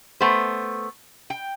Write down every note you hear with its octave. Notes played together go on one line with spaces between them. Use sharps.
A3 B3 C5
G5